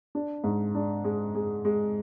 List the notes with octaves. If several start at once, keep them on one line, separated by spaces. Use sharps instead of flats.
D4
G#2
D4
G#3
G#3
G#3